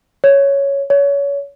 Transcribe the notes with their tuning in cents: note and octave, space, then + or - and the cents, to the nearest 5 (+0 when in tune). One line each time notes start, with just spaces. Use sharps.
C#5 +5
C#5 +25